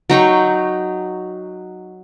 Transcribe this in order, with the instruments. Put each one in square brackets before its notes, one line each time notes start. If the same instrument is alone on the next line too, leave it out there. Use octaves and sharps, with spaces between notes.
[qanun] F#3 D#4 G5 C#6